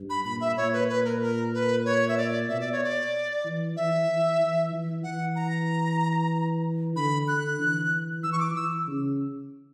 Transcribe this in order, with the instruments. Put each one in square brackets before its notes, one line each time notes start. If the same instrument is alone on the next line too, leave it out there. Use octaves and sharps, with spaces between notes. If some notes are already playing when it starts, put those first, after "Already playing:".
Already playing: [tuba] G2
[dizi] B5
[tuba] A#2 [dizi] B5
[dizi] E5
[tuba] A#2 [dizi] C#5
[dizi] B4
B4
A#4
A#4
B4
C#5
E5
D5
[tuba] B2 [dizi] E5
[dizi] D5
C#5
D5
[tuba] E3
[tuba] E3 [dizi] E5
[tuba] E3
E3
E3
[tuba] E3 [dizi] F#5
[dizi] A#5
[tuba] D3 [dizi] B5
[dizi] F#6
[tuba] E3
[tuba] E3 [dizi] E6
[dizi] C#6
D6
[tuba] E3 [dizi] E6
[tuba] C#3